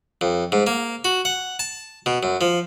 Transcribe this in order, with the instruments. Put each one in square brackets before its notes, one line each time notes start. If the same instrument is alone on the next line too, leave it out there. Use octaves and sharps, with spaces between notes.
[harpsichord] F2
G#2
A#3
F#4
F#5
A5
B2
F#2
F3